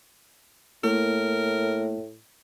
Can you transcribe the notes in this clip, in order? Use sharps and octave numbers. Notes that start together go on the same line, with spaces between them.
A2 A3 A#3 E4 A#4